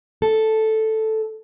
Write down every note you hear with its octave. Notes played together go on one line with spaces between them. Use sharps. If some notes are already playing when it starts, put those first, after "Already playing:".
A4